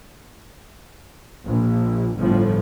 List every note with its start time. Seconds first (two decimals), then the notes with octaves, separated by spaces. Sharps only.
1.47 A#1
2.19 G1 A2 F3